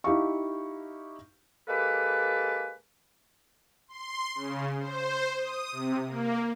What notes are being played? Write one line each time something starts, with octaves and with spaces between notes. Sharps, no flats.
D#4 E4 G4 F5 C#6
G#3 A#3 G4 A4 B4
C6
C#3
C5
D#6
C3
A#3